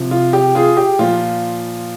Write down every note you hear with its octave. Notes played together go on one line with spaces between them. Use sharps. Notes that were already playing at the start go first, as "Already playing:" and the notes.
Already playing: C3 F3
F4
G4
F4 G#4
G4
A#2 F3 F4